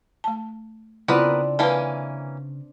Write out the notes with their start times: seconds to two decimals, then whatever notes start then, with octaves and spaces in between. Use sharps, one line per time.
0.24 A3 A5
1.08 C#3 B3 C4 D4 E4 F4 A#4 B4
1.59 E3 A#3 C#4 B4 A5